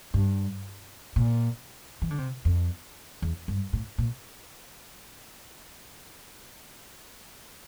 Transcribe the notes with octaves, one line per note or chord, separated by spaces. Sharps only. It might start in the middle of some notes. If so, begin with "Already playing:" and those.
G2
A#2
E3
D3
C3
F2
E2
G2
A2
A#2